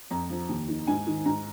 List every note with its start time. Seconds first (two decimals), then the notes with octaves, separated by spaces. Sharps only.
0.11 F2 A#5
0.30 F3
0.49 D#2
0.68 D#3
0.87 G#2 G#5
1.07 D#3
1.25 G#2 A#5